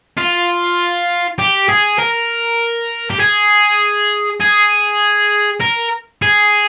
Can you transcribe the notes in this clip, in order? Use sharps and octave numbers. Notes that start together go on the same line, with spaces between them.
F4
G4
G#4
A#4
G4
G#4
G#4
A#4
G#4